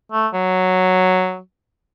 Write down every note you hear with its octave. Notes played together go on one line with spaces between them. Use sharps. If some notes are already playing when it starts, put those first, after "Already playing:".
A3
F#3